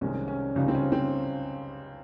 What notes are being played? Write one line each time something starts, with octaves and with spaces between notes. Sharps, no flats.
C2 C3 D#3 G#3 C#4
C#4
C#2 C#3 G3 D#4
C4
C#4
C4